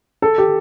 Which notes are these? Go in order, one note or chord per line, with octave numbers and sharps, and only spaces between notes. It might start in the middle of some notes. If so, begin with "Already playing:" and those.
A4
G4